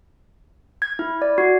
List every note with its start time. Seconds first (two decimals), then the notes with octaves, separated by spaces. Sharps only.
0.82 G#6
0.99 E4
1.22 D5
1.38 F#4